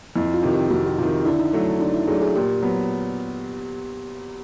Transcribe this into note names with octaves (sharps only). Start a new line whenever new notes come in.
F2 E4
F4
C3 D#3
G4
F2 F#4
F#4
C3 D#3 F4
D3 E4
D#4
F#3 A3 D4 E4
D3 D#4
E4
F#3 A3 D4 G#4
G#4
A#2 G4
F#3 B3